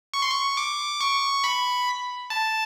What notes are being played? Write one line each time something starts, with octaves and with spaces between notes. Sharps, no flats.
C#6
C6
C#6
D6
C#6
B5
A5